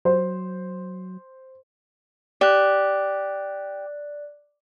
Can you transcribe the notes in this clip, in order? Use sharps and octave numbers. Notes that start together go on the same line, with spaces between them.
F#3 C5
G4 D5 F#6